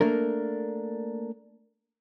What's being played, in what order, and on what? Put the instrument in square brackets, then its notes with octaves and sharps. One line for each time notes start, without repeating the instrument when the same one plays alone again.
[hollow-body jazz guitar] A3 A#3 D4 A#4